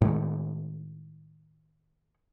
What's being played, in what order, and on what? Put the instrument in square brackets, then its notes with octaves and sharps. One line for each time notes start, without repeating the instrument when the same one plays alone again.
[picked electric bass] A2 D#3 G#3